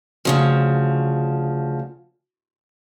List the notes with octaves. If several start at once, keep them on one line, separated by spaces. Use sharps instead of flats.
D2 C#3 F3